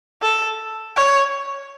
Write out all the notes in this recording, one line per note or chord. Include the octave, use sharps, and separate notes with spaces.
A4
C#5